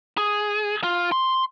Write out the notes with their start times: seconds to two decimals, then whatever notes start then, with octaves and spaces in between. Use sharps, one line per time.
0.18 G#4
0.83 F4
1.12 C6